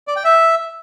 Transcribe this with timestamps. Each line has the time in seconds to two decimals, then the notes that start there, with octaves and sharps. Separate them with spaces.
0.08 D5
0.16 G5
0.25 E5